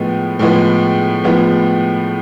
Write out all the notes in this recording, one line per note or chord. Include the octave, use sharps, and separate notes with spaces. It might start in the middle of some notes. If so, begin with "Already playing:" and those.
Already playing: A2 F3 G#3 B3
A2 F3 G#3 B3
A2 F3 G#3 B3